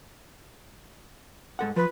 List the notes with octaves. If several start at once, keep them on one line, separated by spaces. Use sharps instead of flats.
G#2 A4 F#5
F3 B4